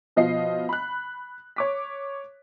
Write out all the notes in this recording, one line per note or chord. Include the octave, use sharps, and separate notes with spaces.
B2 F3 D#5 F5 C7
B5 F#6
C#5 D6 B6